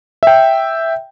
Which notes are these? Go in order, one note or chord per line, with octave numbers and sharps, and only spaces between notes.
E5 G5